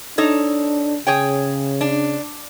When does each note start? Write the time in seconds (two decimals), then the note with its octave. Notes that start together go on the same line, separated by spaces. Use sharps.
0.18 D4 D#4 A4 C#5
1.07 C#3 G#4 C#5 G5
1.81 D4